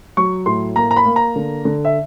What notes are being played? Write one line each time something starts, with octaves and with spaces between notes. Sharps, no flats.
F#3 C#6
A2 C6
A#3 A#5
A#5
B5
A#3
A#5
D3
D3
E5